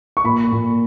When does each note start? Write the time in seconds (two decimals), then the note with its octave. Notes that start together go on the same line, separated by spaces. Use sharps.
0.17 C#6
0.24 A#2 B5
0.52 A#2